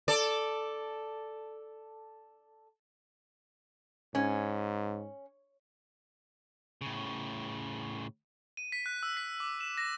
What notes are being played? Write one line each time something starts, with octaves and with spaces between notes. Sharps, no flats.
A4 D5
G#2 C#4
A2 C#3
D#7
B6
F#6
E6
B6
D6
E7
A#6